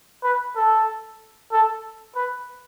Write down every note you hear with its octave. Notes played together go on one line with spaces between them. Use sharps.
B4
A4
A4
B4